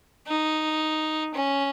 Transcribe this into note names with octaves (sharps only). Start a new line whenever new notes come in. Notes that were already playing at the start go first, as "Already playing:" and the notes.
D#4
C#4